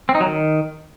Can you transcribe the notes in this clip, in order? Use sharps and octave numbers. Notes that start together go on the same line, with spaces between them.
C4
D#4
F#3
D#3